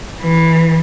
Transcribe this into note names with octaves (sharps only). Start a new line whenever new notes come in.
E3